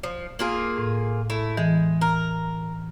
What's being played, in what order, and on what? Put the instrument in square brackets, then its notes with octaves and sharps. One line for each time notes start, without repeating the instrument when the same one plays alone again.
[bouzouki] F3
A#3 F4 G#4
[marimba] A2
[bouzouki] A3 E4
[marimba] E3 [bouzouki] G#3
[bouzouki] A#4